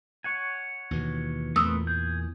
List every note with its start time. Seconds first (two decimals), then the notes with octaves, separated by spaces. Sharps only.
0.24 C#5 F#5 G#5
0.91 D#2 B2 E3
1.56 E2 A#2 A3 C4 B4 D#6 E6
1.87 G#4 G6